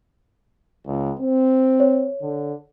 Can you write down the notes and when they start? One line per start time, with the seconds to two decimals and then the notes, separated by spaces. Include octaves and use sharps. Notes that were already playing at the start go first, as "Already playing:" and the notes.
0.86 C#2
1.19 C4
1.80 C#5
2.22 D3